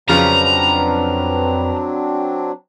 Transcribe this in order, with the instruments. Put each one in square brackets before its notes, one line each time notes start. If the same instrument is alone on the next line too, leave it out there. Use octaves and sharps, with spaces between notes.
[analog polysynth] F2 B4 [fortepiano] C#3 F3 [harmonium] F#3 C4 D4 [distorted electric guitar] A#5